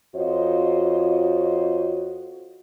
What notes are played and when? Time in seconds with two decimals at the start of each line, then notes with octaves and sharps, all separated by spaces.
0.16 F2 F4 F#4 C5 C#5 D#5